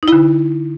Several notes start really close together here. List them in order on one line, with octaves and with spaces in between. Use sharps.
D#4 E4 D3